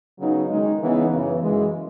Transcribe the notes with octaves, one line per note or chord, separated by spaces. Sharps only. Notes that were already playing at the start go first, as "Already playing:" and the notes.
C#3 F#3 B3 D#4
D#3 G#3 D#4
C#3 E3 B3 D#4
F#2 C#3 E3
F#2 E3 G#3